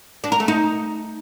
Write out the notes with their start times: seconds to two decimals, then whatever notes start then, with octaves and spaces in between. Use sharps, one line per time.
0.24 D4
0.32 A#4
0.40 A3
0.48 D#4